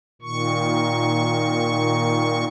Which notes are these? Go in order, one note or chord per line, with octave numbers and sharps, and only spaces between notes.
A#2 D#3 C#6